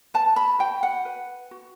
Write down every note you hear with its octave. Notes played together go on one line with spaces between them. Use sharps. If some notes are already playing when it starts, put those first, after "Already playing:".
B4 A5
B5
F#4 G5
F#5
B4
F#4